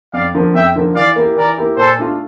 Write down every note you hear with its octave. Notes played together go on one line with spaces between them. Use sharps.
F2 D5 F5
D3 F3 A#3
F2 E5 G5
D3 F3 A#3
E3 D5 F5
A#3 E4 G4
E3 A#4 D5
A#3 E4 G4
A#2 A4 C5
A3 D4 F4